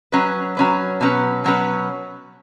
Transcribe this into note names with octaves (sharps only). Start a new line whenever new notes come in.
F#3 C#4 B4
F#3 C#4 B4
B2 F#3 C#4 B4
B2 F#3 C#4 B4